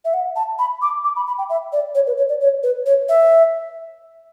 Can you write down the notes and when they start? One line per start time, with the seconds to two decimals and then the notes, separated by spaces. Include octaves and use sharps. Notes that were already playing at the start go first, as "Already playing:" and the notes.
0.05 E5
0.14 F#5
0.36 A5
0.59 B5
0.82 D6
1.04 D6
1.16 B5
1.27 B5
1.38 G5
1.50 E5
1.73 D5
1.95 C#5
2.07 B4
2.18 C#5
2.29 D5
2.41 C#5
2.63 B4
2.86 C#5
3.09 E5